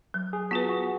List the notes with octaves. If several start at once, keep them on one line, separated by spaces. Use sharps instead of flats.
F#3
G#4
B3 F4 F#4 B4
F#4